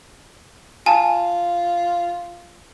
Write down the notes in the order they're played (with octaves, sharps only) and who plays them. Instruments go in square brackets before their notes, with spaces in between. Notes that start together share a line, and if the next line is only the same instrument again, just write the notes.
[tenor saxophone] F4 [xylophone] G#5 A5